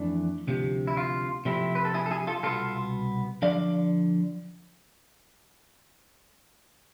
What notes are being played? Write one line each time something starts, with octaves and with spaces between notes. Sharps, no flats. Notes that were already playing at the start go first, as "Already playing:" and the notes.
Already playing: F2 E3 A3 D4
D2 C3 F3
E4
F4
C3 F3 A3 C4 E4
B4
A4
E4 G#4
A4
E4 G#4
F4 A4
C2 B2 B3 F4 A4
D3 F3 D5 F5